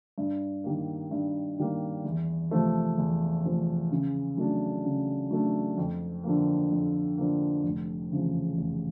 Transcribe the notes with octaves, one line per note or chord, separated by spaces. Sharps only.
G2
D#3 G3 A#3
G2
D#3 G3 A#3
E2
C3 F3 A3
E2
C3 F3 A3
C#3
F#3 A3 D4
C#3
F#3 A3 D4
F2
D3 F3 A#3
F2
D3 F3 A#3
F1
E2 C#3 F3
F1